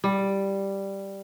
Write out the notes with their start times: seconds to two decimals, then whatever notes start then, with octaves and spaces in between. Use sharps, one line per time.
0.04 G3